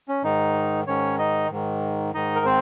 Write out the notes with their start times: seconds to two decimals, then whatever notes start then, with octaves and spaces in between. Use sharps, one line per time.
0.08 C#4
0.24 G#2 D#3 D#4
0.87 G#2 D#3 C#4 C#5
1.19 D#4 D#5
1.50 G#2 D#3
2.14 G#2 D#3 D#4 D#5
2.36 A#4
2.45 C4 C5